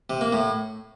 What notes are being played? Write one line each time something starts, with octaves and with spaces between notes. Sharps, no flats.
C3
A#3
A2